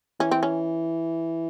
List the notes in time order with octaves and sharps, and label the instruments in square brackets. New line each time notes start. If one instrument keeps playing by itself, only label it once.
[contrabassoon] E3 [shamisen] C#4
[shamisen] C4
C#4